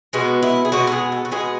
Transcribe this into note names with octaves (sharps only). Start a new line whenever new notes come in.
B2 G#3 B3 F#4
E4
G#4
B2 G#3 B3 F#4
A4
G#4
A4
F#4
B2 G#3 B3 G#4